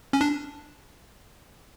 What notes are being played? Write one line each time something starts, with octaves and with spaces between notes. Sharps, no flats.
C#4
D4